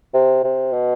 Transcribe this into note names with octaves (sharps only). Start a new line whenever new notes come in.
C3
C3
B2